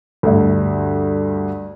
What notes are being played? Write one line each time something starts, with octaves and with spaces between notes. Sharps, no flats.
D2 G2